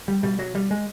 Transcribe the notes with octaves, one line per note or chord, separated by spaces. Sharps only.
G3
B2 G3
F#3
G3
G#3